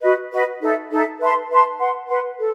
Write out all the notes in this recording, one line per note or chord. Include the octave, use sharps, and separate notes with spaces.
F#4 B4 D#5
F#4 B4 D#5
D#4 A4 E5
D#4 A4 E5
B4 E5 A5 C6
B4 E5 A5 C6
B4 F#5 C6
B4 F#5 C6
A4